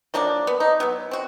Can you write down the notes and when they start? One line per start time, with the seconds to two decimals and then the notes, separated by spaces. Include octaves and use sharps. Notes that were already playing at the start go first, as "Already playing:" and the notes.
0.14 F3 F#3 A#3 D4
0.47 B3
0.60 D#4
0.80 F#3 B3
1.11 C4 F#4